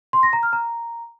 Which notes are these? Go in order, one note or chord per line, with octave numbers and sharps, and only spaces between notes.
C6
A#6
A#5
F6
A#5